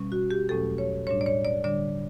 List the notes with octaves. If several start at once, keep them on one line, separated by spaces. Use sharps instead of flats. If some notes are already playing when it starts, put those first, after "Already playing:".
Already playing: B2 G3 C#4
F#4
G4
E2 B2 F#3 A3 C#4 A4
C#5
A2 G3 D4 C#5
D5
C#5
D5
D3 G3 D4 D5